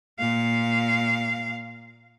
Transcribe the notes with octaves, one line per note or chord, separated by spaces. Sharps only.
A#2 F5